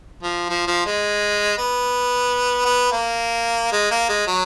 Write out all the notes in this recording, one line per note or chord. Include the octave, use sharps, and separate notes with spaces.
F3
F3
F3
G#3
B3
B3
A#3
G#3
A#3
G#3
F#3